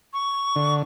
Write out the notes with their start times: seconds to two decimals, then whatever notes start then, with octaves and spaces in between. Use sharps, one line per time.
0.13 C#6
0.56 D3